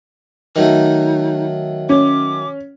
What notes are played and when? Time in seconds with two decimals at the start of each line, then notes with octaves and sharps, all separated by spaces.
0.56 D#3 F#3 A3 D#4
1.89 C#4 D6